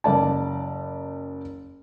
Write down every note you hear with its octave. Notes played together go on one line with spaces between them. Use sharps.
F#1 D5 A5